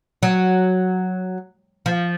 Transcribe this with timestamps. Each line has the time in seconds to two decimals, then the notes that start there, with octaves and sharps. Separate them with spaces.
0.23 F#3
1.86 F3